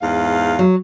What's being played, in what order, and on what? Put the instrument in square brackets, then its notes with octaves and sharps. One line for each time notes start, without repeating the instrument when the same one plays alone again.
[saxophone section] E2 G#2 F5
[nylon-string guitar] F#3